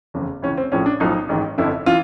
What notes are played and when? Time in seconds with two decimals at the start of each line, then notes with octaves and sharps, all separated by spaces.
0.14 F1 E2 C#3
0.42 C#2 C#3 E3 C#4
0.57 C4
0.72 A#1 A2 F3 C#4
0.86 D4
1.00 B1 A2 F3 D#4
1.29 A1 G#2 D#3
1.58 G1 F2 D3 E4
1.86 E3 F4